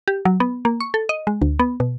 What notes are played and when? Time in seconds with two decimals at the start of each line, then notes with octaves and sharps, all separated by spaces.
0.08 G4
0.25 F#3
0.40 B3
0.65 A#3
0.80 C#6
0.94 A4
1.09 D#5
1.27 G#3
1.42 D2
1.59 B3
1.80 B2